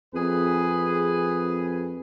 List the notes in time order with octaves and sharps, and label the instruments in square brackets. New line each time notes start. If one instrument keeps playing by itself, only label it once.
[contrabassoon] F2 [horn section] G#4 B4